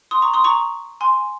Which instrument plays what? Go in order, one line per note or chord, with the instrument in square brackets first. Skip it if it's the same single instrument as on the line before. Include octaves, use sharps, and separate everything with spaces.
[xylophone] C6 D#6
A#5 C#6
C6 D#6
A#5 C#6
G#5 C6